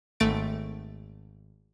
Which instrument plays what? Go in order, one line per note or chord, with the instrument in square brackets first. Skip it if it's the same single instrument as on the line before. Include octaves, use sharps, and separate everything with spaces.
[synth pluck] G#1 A3 A6 D7